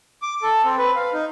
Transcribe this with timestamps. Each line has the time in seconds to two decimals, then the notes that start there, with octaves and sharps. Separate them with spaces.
0.22 D6
0.42 A4
0.64 C4
0.78 B4
0.96 F5
1.13 D#4